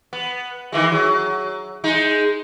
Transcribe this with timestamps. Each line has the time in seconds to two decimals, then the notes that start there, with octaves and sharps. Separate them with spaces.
0.13 B3
0.72 D#3 E3 G#3
0.92 F#3
1.84 G#3 D#4